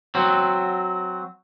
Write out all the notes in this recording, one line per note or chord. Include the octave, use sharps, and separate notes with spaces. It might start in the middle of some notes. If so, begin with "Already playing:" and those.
F#3 C4